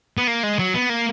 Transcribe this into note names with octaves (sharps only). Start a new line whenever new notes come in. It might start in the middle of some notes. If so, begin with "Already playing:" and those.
B3
A#3
G#3
F#3
B3
A#3